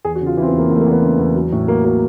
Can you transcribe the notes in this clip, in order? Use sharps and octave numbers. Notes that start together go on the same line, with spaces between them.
E2 G#4
F#4
C#3
F4
E3 E4
C4
B3
E2
A#3
E2 A#3
A3
A#3
E2
B3
C#3
E2
F#3
A2
F#3 A#3
F#3 A#3